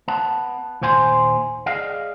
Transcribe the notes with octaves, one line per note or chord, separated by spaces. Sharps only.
B3 A5
D#2 A#2 C5 G#5 C6
G#4 D5 D#5 F5